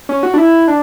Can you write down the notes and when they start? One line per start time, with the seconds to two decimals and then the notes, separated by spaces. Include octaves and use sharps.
0.09 C#4
0.23 F#4
0.34 D4
0.38 E4
0.68 D4